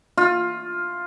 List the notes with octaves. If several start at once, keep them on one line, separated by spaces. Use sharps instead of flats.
F4